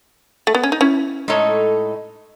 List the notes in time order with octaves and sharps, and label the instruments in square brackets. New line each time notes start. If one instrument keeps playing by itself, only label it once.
[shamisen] A3
B3
C#4
D#4
C#4 E4
[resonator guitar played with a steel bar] A2 G#3 D#4 A4 C#5